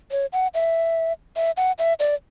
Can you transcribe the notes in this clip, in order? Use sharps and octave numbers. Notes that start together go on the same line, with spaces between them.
C#5
F#5
E5
E5
F#5
E5
D5